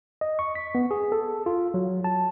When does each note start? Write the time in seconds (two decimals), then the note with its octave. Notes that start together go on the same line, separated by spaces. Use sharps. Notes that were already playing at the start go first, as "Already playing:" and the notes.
0.21 D#5
0.39 C#6
0.55 B6
0.75 B3
0.91 G#4
1.12 A4
1.46 F4
1.74 F#3
2.04 A5